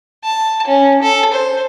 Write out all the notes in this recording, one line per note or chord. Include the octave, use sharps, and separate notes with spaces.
A5
C#4
A4
C5